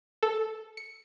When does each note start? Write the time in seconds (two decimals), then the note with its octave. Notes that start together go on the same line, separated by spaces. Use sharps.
0.23 A4
0.77 C#7